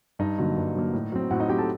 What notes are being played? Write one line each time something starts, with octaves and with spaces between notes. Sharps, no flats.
G2 D#4 D#5
D3 F#3 A#3
G2
D3 F#3 A#3
A2
F#3 C4
A2 F#4 F#5
D#4 D#5
F#3 C4 G4 G5
A4 A5